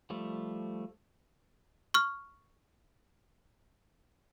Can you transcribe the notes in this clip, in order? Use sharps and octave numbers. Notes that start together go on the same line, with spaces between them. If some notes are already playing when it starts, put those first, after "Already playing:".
F3 G3 A3
C#6 F6